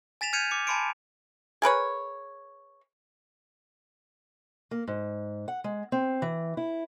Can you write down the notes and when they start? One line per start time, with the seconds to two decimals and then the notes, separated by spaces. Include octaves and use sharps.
0.21 G#5 A6 B6 E7 F7
0.33 F6 G6 G#6 C#7 D#7 F7
0.51 D6 C#7
0.67 G#5 A5 B5 C6 C#7 D7
1.62 G#4 A#4 B4 C#5
4.71 A#3
4.88 G#2
5.48 F#5
5.64 G#3
5.92 C4
6.22 E3
6.57 E4